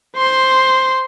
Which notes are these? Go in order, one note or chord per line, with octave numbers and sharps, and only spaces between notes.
C5 C6